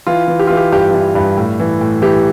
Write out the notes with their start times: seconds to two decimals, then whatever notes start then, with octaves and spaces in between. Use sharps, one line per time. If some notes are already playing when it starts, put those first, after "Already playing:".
0.07 E3 F4
0.28 E3
0.39 G4
0.47 E3 F4
0.57 G4
0.72 G2 G4
0.94 E3
1.15 G2
1.37 A2
1.59 E3
1.81 A2
2.02 E3 G4